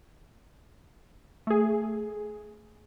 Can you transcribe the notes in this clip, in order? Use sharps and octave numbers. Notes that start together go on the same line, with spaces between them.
A3 G#4